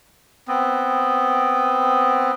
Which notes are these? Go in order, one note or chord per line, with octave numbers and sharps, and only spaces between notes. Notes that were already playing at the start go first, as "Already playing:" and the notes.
B3 C4